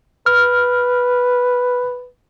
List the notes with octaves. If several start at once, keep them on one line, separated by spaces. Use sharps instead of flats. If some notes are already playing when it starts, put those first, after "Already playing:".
B4 F6